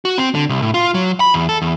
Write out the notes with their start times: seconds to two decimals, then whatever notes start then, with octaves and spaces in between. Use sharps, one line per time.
0.05 F#4
0.18 C4
0.35 D3
0.49 C2
0.62 A2
0.74 F4
0.94 F#3
1.20 B5
1.34 E2
1.49 A4
1.62 E2